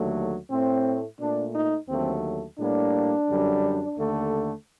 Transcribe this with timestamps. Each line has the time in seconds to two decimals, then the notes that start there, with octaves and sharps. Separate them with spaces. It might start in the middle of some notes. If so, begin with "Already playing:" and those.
Already playing: D#2 D3 F#3 A3
0.50 A2 A3 C4
1.19 A#2 A3 D4
1.54 D#4
1.89 D#2 D3 F#3 A3 C4
2.58 A2 G3 A#3 D4
3.27 F#2 D3 G3
3.97 D#2 D3 A3